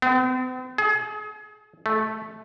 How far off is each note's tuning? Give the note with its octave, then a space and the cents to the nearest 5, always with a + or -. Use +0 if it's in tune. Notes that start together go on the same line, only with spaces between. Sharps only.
C4 -45
G#4 +35
A3 -10